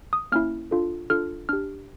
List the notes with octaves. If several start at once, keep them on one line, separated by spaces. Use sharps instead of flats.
D#6
A#3 C#4 E4 F6
D4 F4 A4
D4 F4 A4 F6
D4 G4 F6